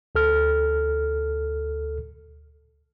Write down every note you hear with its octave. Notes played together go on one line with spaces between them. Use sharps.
D2 A4 F6